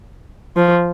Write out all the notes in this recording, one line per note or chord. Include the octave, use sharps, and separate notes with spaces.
F3